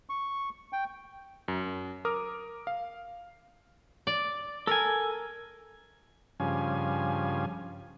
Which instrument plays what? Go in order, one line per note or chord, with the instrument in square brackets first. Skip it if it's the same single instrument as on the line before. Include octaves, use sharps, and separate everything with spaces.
[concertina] C#6
G5
[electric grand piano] F#2
A#4 D6 D#6 F6
F5
[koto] D5
[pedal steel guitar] A4 G#5 [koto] A#4
[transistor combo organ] G2 C#3 F3 G#5